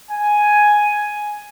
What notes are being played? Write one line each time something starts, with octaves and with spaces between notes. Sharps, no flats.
G#5